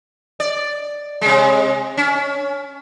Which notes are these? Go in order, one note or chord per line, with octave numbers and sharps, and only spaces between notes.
D5
C3 G#3
C#4